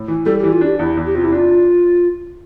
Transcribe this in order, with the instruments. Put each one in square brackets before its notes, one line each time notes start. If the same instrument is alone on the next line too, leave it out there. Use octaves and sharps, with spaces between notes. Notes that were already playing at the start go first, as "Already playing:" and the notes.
Already playing: [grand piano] A2
E3
[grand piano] G3 [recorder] A4
[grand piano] E3 [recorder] G4
[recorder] F4
[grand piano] D4
[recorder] G4
[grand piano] E2 [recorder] E4
[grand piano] E2
[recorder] G4
[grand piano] C3 [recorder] F4
[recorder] E4
[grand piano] D4 [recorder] F4